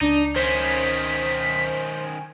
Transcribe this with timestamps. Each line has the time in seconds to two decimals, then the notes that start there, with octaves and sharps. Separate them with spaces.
0.01 C#2 D4 D#4
0.36 D#3 C#4 C5 B6